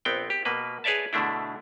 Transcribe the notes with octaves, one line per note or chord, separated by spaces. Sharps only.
A#1 B3 C4 G5
G4
B2 A#3 B4
G#4 B4 C#5 D5 E5 A5
B2 D3 A3 D4 E4